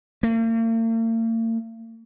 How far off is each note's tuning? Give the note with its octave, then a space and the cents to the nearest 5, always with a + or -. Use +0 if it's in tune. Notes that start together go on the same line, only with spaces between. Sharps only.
A#3 -45